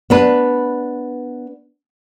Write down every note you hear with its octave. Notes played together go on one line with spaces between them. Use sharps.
B3 D4 B4